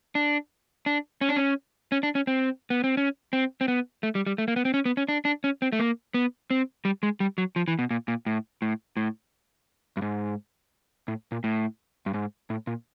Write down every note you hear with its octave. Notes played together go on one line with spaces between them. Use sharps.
D4
D4
C#4
D4
C#4
C#4
D4
C#4
C4
B3
C4
C#4
C4
C4
B3
A3
G3
G3
A3
A#3
B3
C4
C#4
B3
C#4
D4
D4
C#4
C4
A3
A#3
B3
C4
G3
G#3
G3
F#3
F3
E3
B2
A#2
A#2
A2
A2
A2
G2
G#2
A2
A#2
A2
G2
G#2
A2
A#2